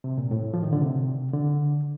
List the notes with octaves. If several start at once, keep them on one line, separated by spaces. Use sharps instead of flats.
C3
A#2
A2
F3
D#3
D3
C3
D3